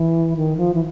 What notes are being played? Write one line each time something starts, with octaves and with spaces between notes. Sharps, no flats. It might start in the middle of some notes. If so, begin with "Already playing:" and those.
Already playing: E3
D#3
F3
E3